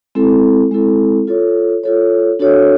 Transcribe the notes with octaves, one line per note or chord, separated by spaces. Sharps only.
G#3 C4 E4 A4
G#3 C4 E4 A4
F4 A4 C#5
F4 A4 C#5
D4 F#4 A4 C#5